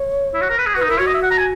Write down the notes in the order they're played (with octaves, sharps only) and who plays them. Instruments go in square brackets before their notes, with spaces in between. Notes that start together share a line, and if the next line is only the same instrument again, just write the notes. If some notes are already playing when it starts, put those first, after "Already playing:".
Already playing: [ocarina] C#5
[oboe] E4
F#4
A#4
B4
G#4
[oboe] F#4 [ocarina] B4
[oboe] D#4
[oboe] E4 [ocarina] A#4
[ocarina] F#4 [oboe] C#5
[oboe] D#5
E5
F#5
A#5
G#5